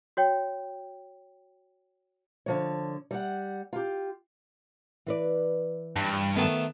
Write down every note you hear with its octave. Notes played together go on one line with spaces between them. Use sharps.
F#4 C#5 G5
D3 F3 C#5
G3 F#5
F4 G4
E3 B4 D5
G2
D#3 A3 B3